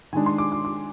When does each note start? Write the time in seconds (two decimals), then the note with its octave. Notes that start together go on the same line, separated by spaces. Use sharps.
0.13 D#3 G#3 D4 G#5
0.26 C6
0.38 D6
0.52 D6
0.65 D6